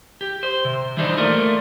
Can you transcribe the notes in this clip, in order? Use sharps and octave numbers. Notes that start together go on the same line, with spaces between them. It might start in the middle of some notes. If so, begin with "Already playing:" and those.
G4
C5
C3
E3 G3 D4 D#4 C5
A3 A#3 F4 A#4 D5